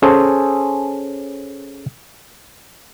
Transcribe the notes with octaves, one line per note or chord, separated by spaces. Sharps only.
C#4 G#4 A4 C5